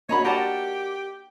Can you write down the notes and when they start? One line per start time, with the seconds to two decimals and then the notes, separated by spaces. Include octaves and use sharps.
0.09 A#3 D4 F#4 C#5 D#5 A#5 B5
0.25 G4 A#4 D5 D#5 F#5 A5 A#5